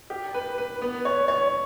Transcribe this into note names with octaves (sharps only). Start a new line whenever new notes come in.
G4
B4
B4
B3
C#5
C#5